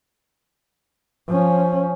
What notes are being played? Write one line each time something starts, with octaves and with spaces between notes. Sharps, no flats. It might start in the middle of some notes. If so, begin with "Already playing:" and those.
F3 C#4